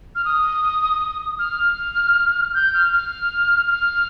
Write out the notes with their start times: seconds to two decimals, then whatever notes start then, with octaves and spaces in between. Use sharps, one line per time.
0.15 F6
0.25 D#6
1.39 F6
2.54 G6
2.74 F6
2.93 F6
3.68 F6